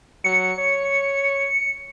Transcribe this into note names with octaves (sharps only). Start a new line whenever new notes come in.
F#3 C#7
C#5